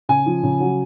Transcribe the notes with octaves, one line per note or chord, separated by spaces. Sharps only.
C#3 G#5
F3
C#3
F#3